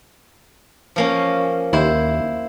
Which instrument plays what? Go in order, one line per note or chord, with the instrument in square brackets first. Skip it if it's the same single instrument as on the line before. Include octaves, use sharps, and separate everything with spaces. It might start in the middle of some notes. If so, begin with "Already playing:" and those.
[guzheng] F3 A#3 C#4
[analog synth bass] D#2 [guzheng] E4 C5